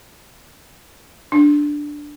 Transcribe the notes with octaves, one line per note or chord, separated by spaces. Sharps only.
D4